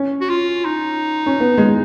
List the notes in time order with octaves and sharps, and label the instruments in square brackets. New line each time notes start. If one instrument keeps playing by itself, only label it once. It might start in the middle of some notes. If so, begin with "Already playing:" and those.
Already playing: [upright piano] C#4
[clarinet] F#4
F4
D#4
[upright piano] C#4
B3
G#3